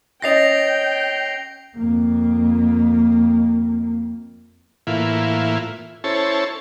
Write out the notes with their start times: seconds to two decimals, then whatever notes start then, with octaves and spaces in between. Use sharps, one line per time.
0.22 C#4 D#5 G5 A6 A#6 C7 F7
1.77 F2 A#3
4.87 A2 E3 A#3 E4 F4
6.04 C#4 E4 A4 C5 C#5 A5